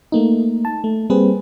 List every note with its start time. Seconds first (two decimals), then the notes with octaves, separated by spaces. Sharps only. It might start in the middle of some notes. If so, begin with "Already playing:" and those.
0.12 A3 A#3 D#4
0.65 A5
0.84 A3
1.10 G3 A#3 C4 G#4 B4